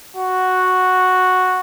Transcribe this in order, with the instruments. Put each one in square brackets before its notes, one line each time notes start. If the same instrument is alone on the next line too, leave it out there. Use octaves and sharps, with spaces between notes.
[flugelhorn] F#4